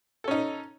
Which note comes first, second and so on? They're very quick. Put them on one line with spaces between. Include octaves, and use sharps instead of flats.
A4 C#4 D#4